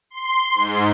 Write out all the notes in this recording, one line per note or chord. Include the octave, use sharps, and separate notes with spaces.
C6
G#2